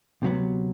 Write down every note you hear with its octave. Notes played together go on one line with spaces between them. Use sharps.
D2 C3 D#3 F#3 B3